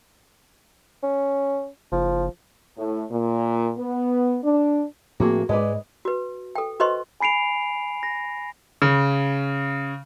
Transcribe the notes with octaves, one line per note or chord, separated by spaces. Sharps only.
C#4
F#1 F3
A2
A#2
B3
D4
A2 F3 A#3 C4 F#4 G#4
G#2 G#3 B4 D5
F#4 B4
A4 G5
F#4 B4 C5 D#5 C6 C#6
G#5 B5 C7 D7 F7
A#6
C#3